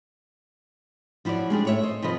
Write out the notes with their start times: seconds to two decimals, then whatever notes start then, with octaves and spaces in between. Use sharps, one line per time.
1.25 F3 E4 F#4 C#5 D5
1.50 G#3 D4 G4 G#4
1.65 A2 C#5 E5
1.83 C5 D#5
2.02 C3 F3 F4 B4 D#5